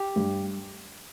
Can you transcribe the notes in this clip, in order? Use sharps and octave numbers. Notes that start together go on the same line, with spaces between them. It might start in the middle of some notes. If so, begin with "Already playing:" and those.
Already playing: G4
G2